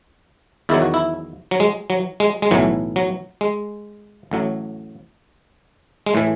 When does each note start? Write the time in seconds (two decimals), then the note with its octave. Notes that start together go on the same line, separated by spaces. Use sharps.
0.69 E2 D#3 F#3 E4
0.82 F#4
0.94 E4
1.51 F#3
1.60 G#3
1.90 F#3
2.20 G#3
2.42 G#3
2.51 B1 A2 E3 F#3
2.96 F#3
3.41 G#3
4.31 A1 A2 F#3
6.06 G#3
6.13 A2 E3 A3